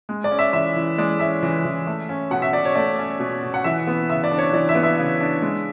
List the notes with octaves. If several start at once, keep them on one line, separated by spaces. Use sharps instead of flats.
G#3
D5
C#4
E5
E3 E5
E3
G#3 D5
C#4 E5
E3
E3
A3
C#4
B2 F#5
E5
B2 D5
C#5
A3 D5
C#4
B2
B2
F#5
E3 E5
B3
C#3 E5
D5
D4
C#5
E3 D5
E5
B3
E5
C#3
D4
G#3